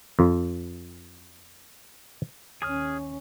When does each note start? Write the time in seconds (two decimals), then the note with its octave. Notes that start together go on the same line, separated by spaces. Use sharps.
0.19 F2 F3
2.62 D#2 C#4 G#4 D#6 F6